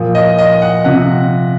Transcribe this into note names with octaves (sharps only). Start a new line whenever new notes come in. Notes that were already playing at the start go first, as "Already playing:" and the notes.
Already playing: A#2 F3
D#5
D#5
F#5
C3 F3 F#5